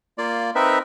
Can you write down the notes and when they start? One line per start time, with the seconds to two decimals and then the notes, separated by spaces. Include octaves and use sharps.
0.18 A#3 F4 D5
0.55 C4 D#4 A#4 B4 E5